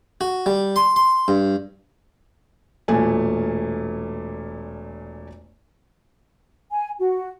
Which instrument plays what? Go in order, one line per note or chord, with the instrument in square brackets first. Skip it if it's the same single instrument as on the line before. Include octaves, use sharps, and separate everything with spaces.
[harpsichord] F#4
G3
C6
C6
G2
[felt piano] E1 A#2 A3 G#5
[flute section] G#5
F#4